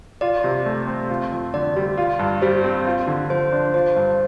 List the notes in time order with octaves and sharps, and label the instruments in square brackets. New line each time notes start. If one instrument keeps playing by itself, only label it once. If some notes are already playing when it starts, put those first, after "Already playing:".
[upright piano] F4 [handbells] D5
[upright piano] C3
A3
C4
F4
F2
[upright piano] D3 [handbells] D5
[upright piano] G3
F4
G2
[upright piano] G3 [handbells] C5
[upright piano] C4
F4
D3
[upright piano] F3 [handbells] C5
[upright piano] D4
[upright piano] F4 [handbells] C5
[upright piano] G2